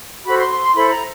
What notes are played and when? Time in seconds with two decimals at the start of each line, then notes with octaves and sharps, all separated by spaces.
0.25 F#4 A4 C5 B5
0.38 C6
0.50 C6
0.61 C6
0.74 E4 A4 C5 B5
0.90 A#5